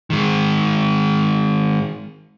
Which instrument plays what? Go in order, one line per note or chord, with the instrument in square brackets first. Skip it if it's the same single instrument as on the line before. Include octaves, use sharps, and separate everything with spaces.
[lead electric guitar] D#3 G#3